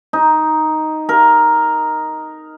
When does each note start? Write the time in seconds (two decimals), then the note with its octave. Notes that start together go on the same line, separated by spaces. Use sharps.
0.13 D#4
1.09 A#4